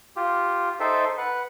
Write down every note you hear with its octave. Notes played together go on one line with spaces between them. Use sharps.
F4 G4
D#4 A4 C5 E5 G5
B4 F#5